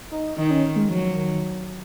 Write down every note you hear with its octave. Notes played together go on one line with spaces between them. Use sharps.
D#4
D#3 D#4
C#4
G#3
F3 F#3
D#3